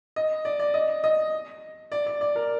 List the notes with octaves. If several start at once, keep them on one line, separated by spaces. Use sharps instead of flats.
D#5
D5
D5
D#5
D#5
D5
D5
D5
A#4